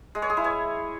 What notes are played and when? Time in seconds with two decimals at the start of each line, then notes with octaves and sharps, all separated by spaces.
0.15 G#3
0.22 C#5
0.30 G#4
0.37 E4
0.44 C#5